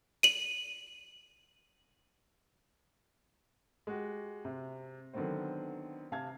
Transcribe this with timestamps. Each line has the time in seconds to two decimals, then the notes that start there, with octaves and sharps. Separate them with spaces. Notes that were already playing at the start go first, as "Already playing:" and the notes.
0.23 D#7 F#7
3.87 G#3 F#4 G4
4.45 C3
5.13 D3 D#3 F#3 B3 C4 C5
6.12 C3 F5 A5 G#6